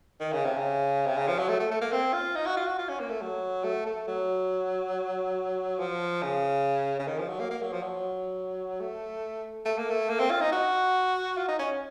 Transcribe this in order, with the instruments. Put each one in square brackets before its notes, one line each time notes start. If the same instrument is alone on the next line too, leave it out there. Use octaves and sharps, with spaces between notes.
[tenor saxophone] D#3
C#3
C3
C#3
C3
C#3
F3
F#3
A3
A3
A3
A#3
C4
F4
D#4
F#4
F4
F#4
F4
C#4
A#3
A3
F#3
A3
A3
F#3
F3
C#3
C#3
D#3
F3
F#3
A#3
A#3
F#3
F3
F#3
A3
A3
A#3
A3
A#3
C4
F4
D#4
F#4
F4
D#4
C#4